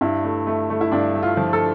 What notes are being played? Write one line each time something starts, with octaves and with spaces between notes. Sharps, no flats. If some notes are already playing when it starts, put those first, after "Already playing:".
G2 E4
A3
A3
A3
E4
G2 D4
A3
F4
F3
A4